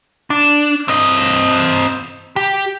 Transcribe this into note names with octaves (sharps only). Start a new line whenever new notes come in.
D4
C4 D#5
G4